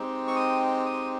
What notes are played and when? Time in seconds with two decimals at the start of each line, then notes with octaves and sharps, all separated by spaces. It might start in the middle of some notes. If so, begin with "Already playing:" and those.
Already playing: G#3 C4 D#4 G4
0.27 C#6
0.36 D#6
0.86 D#6